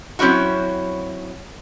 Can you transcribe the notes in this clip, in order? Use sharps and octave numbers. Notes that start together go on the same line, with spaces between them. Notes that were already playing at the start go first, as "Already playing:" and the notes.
F#3 C4 C#4 E4 F#4